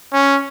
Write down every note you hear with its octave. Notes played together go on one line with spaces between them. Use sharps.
C#4